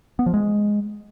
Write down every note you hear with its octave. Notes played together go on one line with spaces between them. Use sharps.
B3
F3
G#3